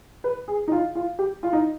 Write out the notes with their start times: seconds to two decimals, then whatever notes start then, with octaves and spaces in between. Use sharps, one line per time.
0.24 B4
0.48 G#4
0.68 D#4
0.72 F4
0.95 F4
1.19 G4
1.43 F4
1.53 D#4